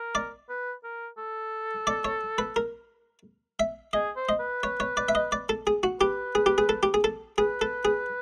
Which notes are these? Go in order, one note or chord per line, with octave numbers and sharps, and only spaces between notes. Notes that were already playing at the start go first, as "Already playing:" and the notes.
Already playing: A#4
D5
B4
A#4
A4
D5
C#5
B4
A#4
E5
G#4 D#5
C5
D#5
B4
C#5
C#5
D5
E5
D#5
D5
A4
G#4
F#4
G4 B4
G#4
G4
G#4
A4
G4
G#4
A4
G#4 B4
A4
G#4